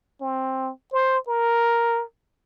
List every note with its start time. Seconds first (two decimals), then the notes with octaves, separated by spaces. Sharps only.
0.21 C4
0.93 C5
1.28 A#4